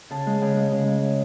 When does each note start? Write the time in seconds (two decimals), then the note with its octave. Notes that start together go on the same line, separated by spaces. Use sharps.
0.10 C#3 A5
0.26 G#3
0.42 C#3
0.56 G#3
0.72 C#3
0.87 G#3